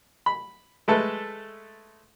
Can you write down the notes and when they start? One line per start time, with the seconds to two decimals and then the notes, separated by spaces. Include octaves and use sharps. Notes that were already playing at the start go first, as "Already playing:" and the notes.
0.26 B5
0.88 G#3 A3 A4 B4